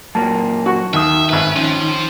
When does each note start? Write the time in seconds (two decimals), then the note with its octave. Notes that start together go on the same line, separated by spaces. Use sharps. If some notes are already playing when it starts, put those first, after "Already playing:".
0.15 F#2 A#2 A#3 A5
0.66 F#4 C#6
0.94 D#2 D#3 E5 D#6
1.29 G#1 B4 E5
1.56 F3 C#4